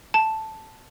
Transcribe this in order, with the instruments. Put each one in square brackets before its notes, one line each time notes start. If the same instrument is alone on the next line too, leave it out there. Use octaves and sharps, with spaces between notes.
[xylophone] A5